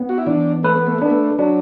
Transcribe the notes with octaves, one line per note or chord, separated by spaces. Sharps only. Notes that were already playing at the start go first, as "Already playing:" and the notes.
Already playing: B3
F#4
E4
E3 D4
A3 B4
B3
A3
B3 D4
A3
F#3 D4